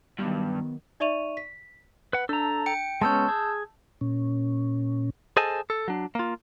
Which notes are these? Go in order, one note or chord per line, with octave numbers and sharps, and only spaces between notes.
G2 D#3 F#3 B3
D#4 D5 E5 C#6 D#7 F7
B6
B4 F#5
D4 A4 A#5
G5 C#7
G#3 B3 C#4 A5 E6 G6
G#4
A#2 C#4
G#4 A4 C5 D#5 G#5 A5
A4
F#3 D4
A#3 F4